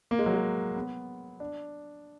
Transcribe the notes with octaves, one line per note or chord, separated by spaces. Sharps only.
A#3
G#3
F#3
G#3
B3
D4